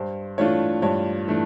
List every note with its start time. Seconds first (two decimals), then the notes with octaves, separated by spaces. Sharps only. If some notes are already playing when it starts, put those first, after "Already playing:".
Already playing: G2 C5
0.38 E3 A3 D4 F4 C#5
0.82 G2 C#5
1.28 E3 A3 D4